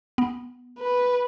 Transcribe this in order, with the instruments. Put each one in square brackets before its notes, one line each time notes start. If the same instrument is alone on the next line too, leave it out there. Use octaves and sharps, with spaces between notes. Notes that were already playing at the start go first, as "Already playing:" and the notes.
[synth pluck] B3
[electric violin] B4